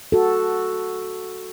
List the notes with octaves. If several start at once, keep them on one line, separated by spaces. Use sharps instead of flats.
F#4 A4